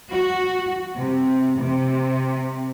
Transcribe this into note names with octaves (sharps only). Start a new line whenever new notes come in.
F#4
C3
C3